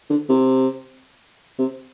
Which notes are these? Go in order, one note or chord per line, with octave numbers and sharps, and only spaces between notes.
D3
C3
C3